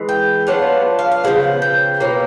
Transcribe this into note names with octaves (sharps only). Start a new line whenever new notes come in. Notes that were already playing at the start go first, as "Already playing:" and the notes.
Already playing: E3 G#3
G5
F#3 B3 D4 F4 F#5
F5
F5
C#3 F3 G#3 B3 F#5
G5
B2 F#3 A#3